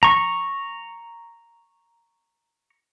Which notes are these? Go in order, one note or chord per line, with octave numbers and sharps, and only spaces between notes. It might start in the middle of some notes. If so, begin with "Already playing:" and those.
A#5 C#6